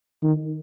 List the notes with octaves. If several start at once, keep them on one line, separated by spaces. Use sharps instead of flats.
D#3